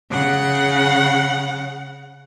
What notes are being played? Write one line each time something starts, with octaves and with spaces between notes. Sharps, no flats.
C#3 F#5